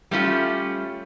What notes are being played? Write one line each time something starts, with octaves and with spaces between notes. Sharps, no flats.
G3 A3 C#4 F4